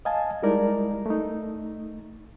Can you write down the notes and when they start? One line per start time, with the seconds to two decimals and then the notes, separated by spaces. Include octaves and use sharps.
0.05 D#5 F5 G#5 A5
0.43 G3 G#3 D#4 E4 A#4 D5
1.06 A3 D#4